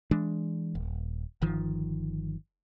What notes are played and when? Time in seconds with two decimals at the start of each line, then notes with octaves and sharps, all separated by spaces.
0.11 E3 G#3 D4
0.75 D#1
1.42 G1 D#3 F3